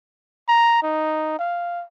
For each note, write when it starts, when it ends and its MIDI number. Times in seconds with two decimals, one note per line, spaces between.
0.49 0.81 82
0.83 1.36 63
1.39 1.85 77